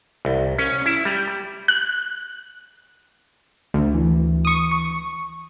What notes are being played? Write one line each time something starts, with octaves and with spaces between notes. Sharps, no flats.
C2
C#4
E4
G3
F#6
D2
E3
C#6 D#6
C#6